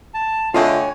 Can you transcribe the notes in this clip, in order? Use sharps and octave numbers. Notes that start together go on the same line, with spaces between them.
A5
D3 A3 F4 C#5 D#5 G5 G#5